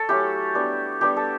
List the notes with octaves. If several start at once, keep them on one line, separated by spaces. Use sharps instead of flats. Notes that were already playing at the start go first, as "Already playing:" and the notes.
Already playing: A4 C#5
F#3 A3 C#4 E4 G4
G3 B3 D4
G3 B3 D4 G4
A4